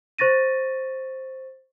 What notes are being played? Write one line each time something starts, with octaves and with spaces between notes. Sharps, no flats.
C5 C#6 A6 A#6 D#7